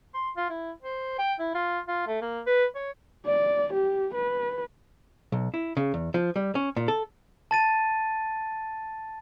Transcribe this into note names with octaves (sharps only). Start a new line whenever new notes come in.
C6
F4
E4
C5
G5
E4
F4
F4
A3
A#3
B4
C#5
D5
G4
B4
B1
E4
C#3
E2
F3
G3
C#4
A#2
A4
A5 A6 D#7